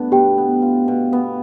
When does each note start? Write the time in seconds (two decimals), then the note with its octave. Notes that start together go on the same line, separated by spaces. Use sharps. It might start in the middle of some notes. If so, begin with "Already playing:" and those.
Already playing: G2 A3 B3 D4
0.12 B2 G4 G5
0.38 B3
0.62 F4
0.88 B2
1.13 B3